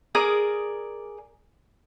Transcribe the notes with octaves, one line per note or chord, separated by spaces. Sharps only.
G#4 A#4 D5 D#6